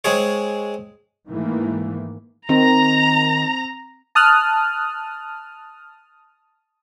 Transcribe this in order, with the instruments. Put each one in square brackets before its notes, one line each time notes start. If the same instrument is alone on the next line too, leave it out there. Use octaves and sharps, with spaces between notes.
[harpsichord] G#3 C4 G#4 C#5
[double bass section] G#2 D#3 E3 A3 A#3
[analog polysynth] D#3 [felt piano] C4 [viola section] A#5
[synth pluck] A5 D#6 F6 F#6